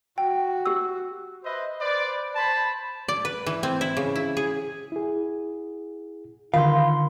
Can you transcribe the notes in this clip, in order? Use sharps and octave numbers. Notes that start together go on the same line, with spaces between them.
F#4 G5
G4 E6
B4 C5 D#5 E5
B4 C5 D5
C5 A5 B5
D5
B4
E3
C4
E4
C#3
E4
G#4
E4 G#4
D3 D#3 F4 A#4 F5 B5 C6